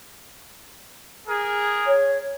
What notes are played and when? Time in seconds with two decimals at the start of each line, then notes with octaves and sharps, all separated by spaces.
1.27 G#4 A#4
1.87 C#5